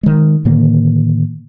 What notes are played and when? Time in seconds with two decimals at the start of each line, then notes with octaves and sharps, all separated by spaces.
0.03 D#3 G#3
0.45 A2 D3 D#3 A#3